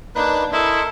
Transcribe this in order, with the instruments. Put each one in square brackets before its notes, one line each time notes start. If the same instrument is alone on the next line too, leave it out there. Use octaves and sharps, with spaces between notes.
[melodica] A#3 D#4 B4 [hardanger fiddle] D4 [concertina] F#6
[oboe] E4 [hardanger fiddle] A4 [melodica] A#4 [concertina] D#5 E5 C6